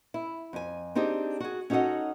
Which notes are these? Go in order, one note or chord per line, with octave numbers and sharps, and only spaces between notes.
E4
F2 G#5
C4 D4 D#4 G4 G#4
F#4 G#4
C#4 D#4 F#4 A4 D#5 F#5